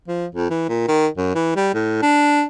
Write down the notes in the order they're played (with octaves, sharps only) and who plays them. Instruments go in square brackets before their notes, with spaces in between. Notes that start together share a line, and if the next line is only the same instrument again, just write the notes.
[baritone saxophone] F3
F2
E3
A#2
D#3
F#2
E3
G3
A2
D4